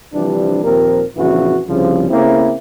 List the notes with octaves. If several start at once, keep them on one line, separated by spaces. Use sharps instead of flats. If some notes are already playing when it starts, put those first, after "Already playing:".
C3 E3 F3 G3 D4
D#2 A#2 F3 C4 A#4
A#1 F2 C#3 E3 F#3 F#4
C2 C#3 F3
C#3 A3 A#3 C4 E4